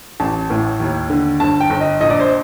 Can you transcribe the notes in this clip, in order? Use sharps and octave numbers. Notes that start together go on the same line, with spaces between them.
A1 A5
A2
D#2
D3
G1 A5
G5
G1
D#5
A#1 D#5
D5
C5